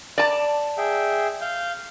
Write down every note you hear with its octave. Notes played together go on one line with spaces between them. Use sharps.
D5 A5
G#4 E5 G5
F5 G6